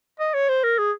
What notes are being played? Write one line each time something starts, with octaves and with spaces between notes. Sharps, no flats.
D#5
C#5
C5
A#4
G#4